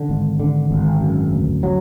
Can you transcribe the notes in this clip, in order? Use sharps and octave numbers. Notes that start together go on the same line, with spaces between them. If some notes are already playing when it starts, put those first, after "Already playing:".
Already playing: D3
G#1
D3
G#1
F#2
D2
F#3